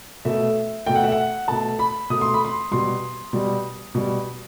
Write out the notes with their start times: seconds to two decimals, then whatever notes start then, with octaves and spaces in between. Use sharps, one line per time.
0.25 B2 A3 E5
0.86 B2 A3 G5
0.95 F#5
1.03 E5
1.12 F#5
1.48 B2 A3 A5
1.79 B5
2.10 B2 A3 D#6
2.21 C6
2.34 B5
2.45 C6
2.71 B2 G3 C6
3.33 B2 G3
3.95 B2 G3